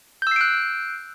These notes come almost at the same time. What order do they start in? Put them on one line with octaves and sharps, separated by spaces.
G6 E6 C7 D7 F#6